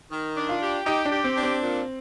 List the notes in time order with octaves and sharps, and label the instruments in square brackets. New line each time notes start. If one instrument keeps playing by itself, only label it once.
[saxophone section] D#3
D4
[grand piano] F4
[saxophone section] G4
[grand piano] D#4 [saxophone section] G4
[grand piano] D4
[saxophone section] G4
[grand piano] C4
[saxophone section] D4
[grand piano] C4
[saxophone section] A#2